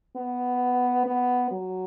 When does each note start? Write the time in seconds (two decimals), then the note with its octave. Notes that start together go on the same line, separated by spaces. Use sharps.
0.16 B3
1.06 B3
1.51 F#3